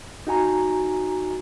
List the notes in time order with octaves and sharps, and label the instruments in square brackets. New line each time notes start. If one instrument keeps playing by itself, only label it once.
[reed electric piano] D#4 F#4 G#5 A#5